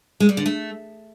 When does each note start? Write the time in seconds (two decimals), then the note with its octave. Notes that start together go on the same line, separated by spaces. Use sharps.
0.20 G#3
0.29 G3
0.37 D3
0.46 A3